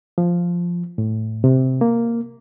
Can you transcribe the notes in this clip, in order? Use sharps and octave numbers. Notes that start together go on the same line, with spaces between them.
F3
A2
C3
A#3